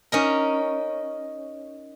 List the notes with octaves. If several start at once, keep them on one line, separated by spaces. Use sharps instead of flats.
C#4 D#4 A#4